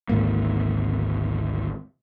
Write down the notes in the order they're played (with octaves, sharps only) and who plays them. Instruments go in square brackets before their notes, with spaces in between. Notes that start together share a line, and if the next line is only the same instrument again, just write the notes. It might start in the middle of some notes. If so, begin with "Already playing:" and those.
[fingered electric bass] G#1 D2 G#2 A#3